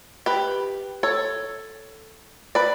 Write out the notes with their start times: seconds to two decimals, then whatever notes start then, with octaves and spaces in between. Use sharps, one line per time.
0.26 G4 B4
1.03 A4 C#5
2.55 B4 D5